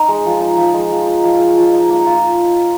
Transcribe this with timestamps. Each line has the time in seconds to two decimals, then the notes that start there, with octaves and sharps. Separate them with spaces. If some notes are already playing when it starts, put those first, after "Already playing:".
Already playing: D#4
0.08 G#3
0.25 F3
0.41 D#4
0.57 F3
0.74 G#3
0.91 F3
1.07 D#4
1.23 F3
1.40 G#3
1.56 F3
1.73 D#4
1.90 A#3
2.06 F4